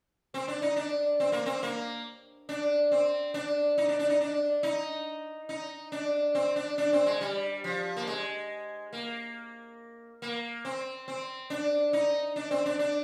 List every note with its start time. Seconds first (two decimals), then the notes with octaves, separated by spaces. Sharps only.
0.34 C4
0.48 D4
0.62 D#4
0.76 D4
1.20 C4
1.32 A#3
1.46 C4
1.63 A#3
2.49 D4
2.92 C4
3.34 D4
3.78 D#4
3.88 D4
3.99 D4
4.09 D#4
4.21 D4
4.63 D#4
5.49 D#4
5.92 D4
6.35 C4
6.56 D4
6.78 D4
6.93 C4
7.06 G#3
7.21 G3
7.64 F3
7.96 A#3
8.07 G#3
8.93 A#3
10.22 A#3
10.65 C4
11.08 C4
11.50 D4
11.93 D#4
12.36 D4
12.51 C4
12.66 D4
12.79 D4